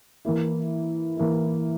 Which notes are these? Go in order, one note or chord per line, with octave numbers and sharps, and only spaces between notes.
E3 A#3 E4
E3 A#3 E4